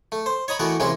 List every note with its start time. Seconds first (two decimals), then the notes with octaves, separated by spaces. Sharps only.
0.12 A3
0.26 C5
0.48 C#5 D#5 A#5 B5
0.59 E3 A3 B3 F#4 A#4
0.80 C3 E3 G#3 A#3 C4 C#4